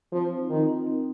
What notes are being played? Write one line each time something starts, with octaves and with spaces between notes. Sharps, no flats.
F3 C4
F4
D#4
D#3 C4
D#4
C4